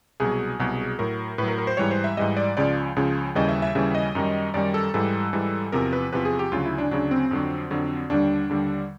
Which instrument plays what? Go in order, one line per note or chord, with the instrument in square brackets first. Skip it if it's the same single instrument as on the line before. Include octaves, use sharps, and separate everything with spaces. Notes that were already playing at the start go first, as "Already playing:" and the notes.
[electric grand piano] C2 B2 F#3 G#4
C2 B2 F#3
A2 F#3 A#4
A2 B4
F#3 A#4
A#4
C5
G#2 E3 G3 C#5
C5
E5
G#2 E3 G3 D#5
D5
C#2 C#3 F3 D5
C#2 C#3 F3
D#2 C#3 E3 G3 D#5
E5
E5
D#2 C#3 E3 G3 E5
D#5
F#2 D#3 G3
F#2 D#3 G3 D5
A4
G#2 E3 G3 A4
G#2 E3 G3
E2 C3 F3 A#4
B4
E2 C3 F3 B4
G#4
G4
D2 C#3 F#3 F4
E4
D4
D2 C#3 F#3 D4
C4
F2 D3 F#3
F2 D3 F#3
D#2 D3 G3 D4
D#2 D3 G3